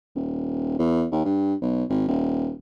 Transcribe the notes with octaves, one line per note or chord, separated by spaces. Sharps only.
D#1
E2
D#2
G2
B1
G#1
D#1